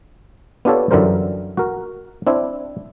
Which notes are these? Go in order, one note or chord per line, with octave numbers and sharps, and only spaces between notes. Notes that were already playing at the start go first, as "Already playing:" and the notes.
B3 D4 F4 G4 A4 C#5
F#2 D3 E3 G3 A#4 C5
F#4 A#4
C4 D4 E4